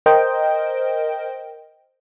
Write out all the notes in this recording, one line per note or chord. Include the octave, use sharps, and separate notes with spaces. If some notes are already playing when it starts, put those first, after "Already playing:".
A#4 C5 D#5 G5